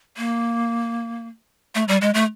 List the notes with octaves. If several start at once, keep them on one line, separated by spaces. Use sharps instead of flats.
A#3
A3
G3
G#3
A3